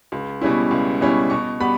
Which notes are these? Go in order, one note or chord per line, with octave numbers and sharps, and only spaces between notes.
C#2
B2 G3 C#4 E4
C#2
B2 G3 C#4 E4
B2 C#6
G3 B3 B5